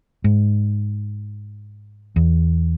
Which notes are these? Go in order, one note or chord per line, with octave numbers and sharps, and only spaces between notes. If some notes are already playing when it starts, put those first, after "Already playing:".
G#2
E2